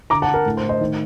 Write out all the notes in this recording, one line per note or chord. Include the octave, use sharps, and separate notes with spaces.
D3 A#5 D6
F#5 A5
D3
A#4
A2
C5
A2
C5 D#5
D#3